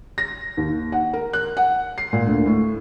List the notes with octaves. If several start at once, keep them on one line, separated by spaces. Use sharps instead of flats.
A#6
D#2
F#5
A#4
F#6
F#5
C7
A#2
D2
A2